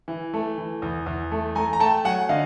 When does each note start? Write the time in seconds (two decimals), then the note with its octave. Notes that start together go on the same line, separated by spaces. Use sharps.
0.08 E3
0.34 A3
0.58 E3
0.82 E2
1.06 E2
1.32 A3
1.55 A3 G#5 A#5
1.73 A#5
1.80 A3 G5 A5
2.05 F#3 F#5 G#5
2.29 D3 D#5 F5